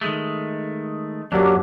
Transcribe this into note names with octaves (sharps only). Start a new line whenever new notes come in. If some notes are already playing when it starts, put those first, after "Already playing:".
D#3 G#3 A3
F#2 F#3 A#3 D4 G4